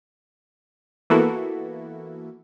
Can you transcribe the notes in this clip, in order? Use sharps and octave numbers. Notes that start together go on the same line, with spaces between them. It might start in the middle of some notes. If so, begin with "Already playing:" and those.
E3 A#3 B3 E4 F#4 A4